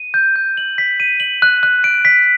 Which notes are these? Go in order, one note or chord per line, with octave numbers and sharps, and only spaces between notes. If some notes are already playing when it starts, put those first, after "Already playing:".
Already playing: D#7
G6
G6
F#7
B6
D#7
F#7
F#6
F#6
D7
B6